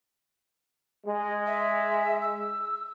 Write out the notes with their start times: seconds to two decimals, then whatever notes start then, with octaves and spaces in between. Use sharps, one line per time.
1.06 G#3
1.47 E5
2.22 E6